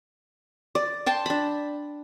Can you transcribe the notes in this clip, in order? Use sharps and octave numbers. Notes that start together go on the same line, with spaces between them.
D5
G5 A5 C6
D4 B5